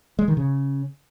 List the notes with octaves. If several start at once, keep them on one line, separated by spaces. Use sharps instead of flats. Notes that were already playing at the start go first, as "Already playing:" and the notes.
G#3
D#3
C#3